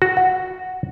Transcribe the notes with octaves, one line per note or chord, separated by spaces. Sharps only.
F#4
F#5